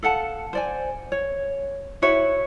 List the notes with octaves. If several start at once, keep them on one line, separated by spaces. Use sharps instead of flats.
A4 F5 F#5 A5
C5 D5 G#5
C#5
E4 F#4 C#5 E5